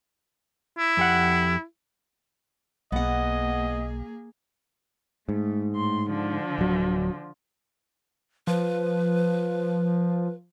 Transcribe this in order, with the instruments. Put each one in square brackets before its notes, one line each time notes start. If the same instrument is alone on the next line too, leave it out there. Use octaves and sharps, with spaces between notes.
[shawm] E4
[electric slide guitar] F2 G4 F#5
[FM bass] B1 [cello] A#3 G#4 [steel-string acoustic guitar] B3 F#5 [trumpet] D#5
[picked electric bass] G#2 [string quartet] A3
[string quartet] A2 C6
D3 F3
[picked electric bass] D1 F#3
[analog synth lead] F3 [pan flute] B4